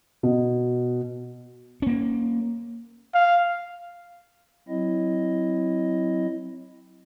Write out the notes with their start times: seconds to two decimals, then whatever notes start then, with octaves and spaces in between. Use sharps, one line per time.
0.23 B2
1.82 A#3 C#4
3.14 F5
4.68 F#3 C4 E4 D#5